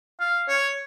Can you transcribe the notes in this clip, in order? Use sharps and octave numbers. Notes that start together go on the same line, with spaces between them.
F5
C#5